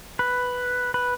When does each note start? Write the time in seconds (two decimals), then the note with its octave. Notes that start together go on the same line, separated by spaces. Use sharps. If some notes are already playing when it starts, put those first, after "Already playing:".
0.19 B4
0.94 B4